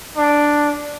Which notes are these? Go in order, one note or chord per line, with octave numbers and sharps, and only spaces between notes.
D4